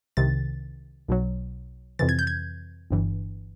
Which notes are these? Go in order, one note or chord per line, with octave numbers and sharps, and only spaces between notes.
C2 C3 D#3 A6
B1 B2 F#3
F2 C3 E3 A6
G#6
G6
G#6
G1 G2 E3